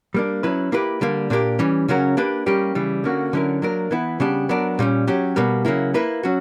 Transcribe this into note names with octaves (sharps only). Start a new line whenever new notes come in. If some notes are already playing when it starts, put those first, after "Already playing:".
G3 A#3 D4
F#3 C#4 E4 B4
A#3 E4 G4 B4
D3 G3 A#3
A#2 A#3 D4 G4 A#4
E3 G3 C#4
C#3 F#3 C#4 F#4 A#4
A#3 D4 G4 B4
G3 A#3 C#4 G4
C#3 E3 G3
D3 A#3 C#4 F#4
D3 F#3 C#4 E4 A#4
F#3 A#3 D4 A#4
E3 B3 E4
C#3 G3 B3 D4 G4
F#3 B3 D4 A#4
A#2 G3 C#4
F#3 C#4 G4
B2 G3 A#3
C#3 F#3 A#3 E4
A#3 E4 B4
F#3 C#4 F#4